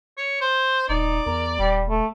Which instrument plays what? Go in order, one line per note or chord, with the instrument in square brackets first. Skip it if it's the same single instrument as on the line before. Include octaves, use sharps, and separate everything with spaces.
[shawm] C#5
C5
[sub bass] D#1 [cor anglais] D#4 [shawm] D5
[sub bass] E2 [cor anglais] A#4
[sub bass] D#1 [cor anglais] G3
[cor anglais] A3